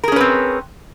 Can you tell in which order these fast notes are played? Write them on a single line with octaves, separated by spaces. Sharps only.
A#4 G#4 C#4 B4 C4